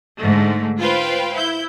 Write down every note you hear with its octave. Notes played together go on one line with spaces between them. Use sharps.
G#2 D3 A3
F4 B4 C5 F5 G5
E4 G6